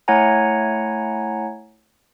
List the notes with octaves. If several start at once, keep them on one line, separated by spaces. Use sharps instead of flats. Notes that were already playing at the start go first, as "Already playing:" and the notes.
A3 E4 C#5 F#5 G#5 A#5